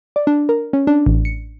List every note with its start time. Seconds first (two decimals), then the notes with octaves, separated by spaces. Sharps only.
0.16 D5
0.27 D4
0.49 A#4
0.73 C#4
0.87 D4
1.06 A1
1.25 C#7